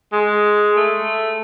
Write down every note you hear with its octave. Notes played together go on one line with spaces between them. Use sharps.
G#3
A3